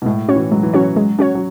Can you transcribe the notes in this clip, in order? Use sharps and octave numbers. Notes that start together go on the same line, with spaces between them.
B2
A2 G#3
C#4 F#4 C#5
E3
F#3 G#3
E3
F#3 C#4 F#4 C#5
G#3
C#4 F#4 C#5
F#3